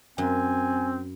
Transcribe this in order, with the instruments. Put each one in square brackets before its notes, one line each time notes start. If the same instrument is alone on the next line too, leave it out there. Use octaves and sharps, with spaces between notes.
[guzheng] F#2 [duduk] C4 [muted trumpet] G#5